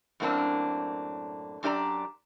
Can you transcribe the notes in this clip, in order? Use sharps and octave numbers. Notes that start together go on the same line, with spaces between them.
F#2 A2 A#3 C4 D4
F#2 D4 G4 D5 A#5